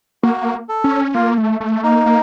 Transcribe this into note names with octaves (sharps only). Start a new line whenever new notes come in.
A#3 F#4
A4
C#4
A#3 F4
A3
A3
A#3 D#4
A#3